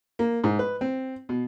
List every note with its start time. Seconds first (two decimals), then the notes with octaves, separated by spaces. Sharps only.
0.19 A#3
0.44 G#2
0.59 B4
0.81 C4
1.29 B2